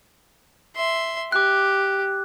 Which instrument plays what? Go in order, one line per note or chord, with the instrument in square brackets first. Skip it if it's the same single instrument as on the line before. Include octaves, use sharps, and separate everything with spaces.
[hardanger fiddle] E5 C6
[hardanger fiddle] G4 [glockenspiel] D6 F#6